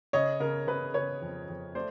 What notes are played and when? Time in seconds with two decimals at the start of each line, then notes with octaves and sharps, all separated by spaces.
0.13 C#3 C#5 D#5
0.40 C#3 A#4
0.67 C#3 B4
0.94 C#3 B4 C#5
1.22 F2
1.49 F2
1.75 A3 C5 D5